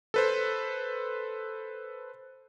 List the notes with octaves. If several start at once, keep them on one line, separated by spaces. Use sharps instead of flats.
A4 B4 C5